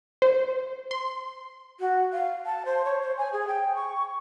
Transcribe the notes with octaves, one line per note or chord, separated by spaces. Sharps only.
C5
C6
F#4
F5
A5
C5
C#5
C5
G#5
G#4
G5
C#6